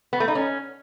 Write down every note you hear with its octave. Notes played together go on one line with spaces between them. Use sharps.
B3
A3
D#4
C#4